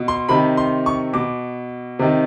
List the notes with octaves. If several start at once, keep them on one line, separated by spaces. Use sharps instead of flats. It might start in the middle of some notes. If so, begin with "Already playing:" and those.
Already playing: B2
C6
C3 D#3 B5
C6
C#6
B2 D6
C3 D#3